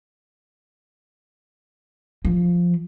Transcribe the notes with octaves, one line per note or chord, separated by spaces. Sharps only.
F3